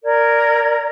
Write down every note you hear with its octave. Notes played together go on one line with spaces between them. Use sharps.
A#4 D5 G#6